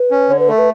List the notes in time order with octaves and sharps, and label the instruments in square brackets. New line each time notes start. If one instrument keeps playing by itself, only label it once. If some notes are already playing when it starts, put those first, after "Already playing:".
Already playing: [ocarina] B4
[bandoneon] C#4
[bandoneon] D3 [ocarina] C#5
[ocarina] B4
[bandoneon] A3 [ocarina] A4
[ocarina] B4